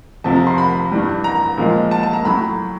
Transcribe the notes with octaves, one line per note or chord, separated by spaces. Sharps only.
F2 C3 F3 A5
A#5
C6
B5
G2 E3 G3
A#5
A#2 F3 G#3
A5
A5
A#5
A2 F#3 B5